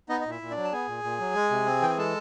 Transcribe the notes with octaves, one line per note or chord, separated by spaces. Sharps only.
B3 D#4 D#5
D#5
A#2 E4 E5
A#2
D4 D5
F#3
A5
B3 G#4 G#5
A#2
A#2
F#3
G#3
C3
C4
E3 G5
G#5
G#3 A4 A5